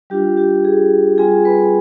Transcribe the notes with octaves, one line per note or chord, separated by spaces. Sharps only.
G3 D4 F4 G4
G4
G#4
G3 C4 F4 G#4 G#5
B4 B5